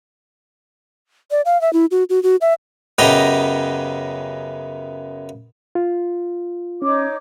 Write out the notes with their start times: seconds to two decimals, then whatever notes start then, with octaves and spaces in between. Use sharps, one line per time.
1.31 D5
1.45 F5
1.61 E5
1.73 E4
1.91 F#4
2.10 F#4
2.23 F#4
2.41 E5
2.99 F#2 C#3 B3 G4 D#5 A#5
5.75 F4
6.82 C#4 D#4 C#5 D6